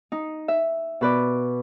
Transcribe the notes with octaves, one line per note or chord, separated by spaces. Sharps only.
D#4
E5
B2 B4 D5